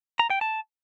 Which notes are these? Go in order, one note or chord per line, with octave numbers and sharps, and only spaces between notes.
A#5
G5
A5